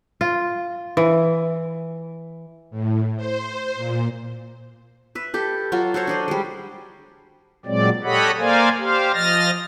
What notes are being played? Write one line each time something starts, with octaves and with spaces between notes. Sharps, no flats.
F4
E3
A2
C5
A#2
B4 E5
G4 A4
F#3 F4 F#4
F#4 A4 C5 C#5
D4 C5 D#5
G3 G#3
A#2 F#3 G#3 C4 D5
G4 A4 C#5 D#5 F#5 B5
A#3 A#4 C5 D5 F5 G#5
G4 C5 F5
F3 D#5 F6 A6 A#6